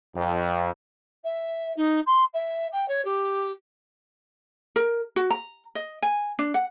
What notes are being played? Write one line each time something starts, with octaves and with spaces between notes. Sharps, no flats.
F2
E5
D#4
C6
E5
G5
C#5
G4
A#4
F#4
A#5
D#5
G#5
D4
F#5